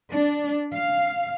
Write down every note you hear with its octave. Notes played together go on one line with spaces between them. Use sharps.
D4
F5